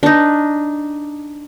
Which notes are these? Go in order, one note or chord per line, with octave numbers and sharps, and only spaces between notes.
D4 D#4